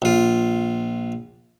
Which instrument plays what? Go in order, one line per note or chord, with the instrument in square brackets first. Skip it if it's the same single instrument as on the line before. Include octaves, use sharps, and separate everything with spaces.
[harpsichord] A#1 F4